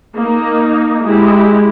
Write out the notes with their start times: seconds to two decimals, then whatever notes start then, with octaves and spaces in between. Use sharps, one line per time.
0.15 A#3 D#4
1.03 G#3 E4 G4